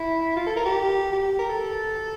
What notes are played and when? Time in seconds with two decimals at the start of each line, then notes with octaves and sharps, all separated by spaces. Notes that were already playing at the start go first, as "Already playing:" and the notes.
Already playing: E4
0.37 F4
0.47 A4
0.56 A#4
0.66 G4
1.12 G4
1.39 A#4
1.50 A4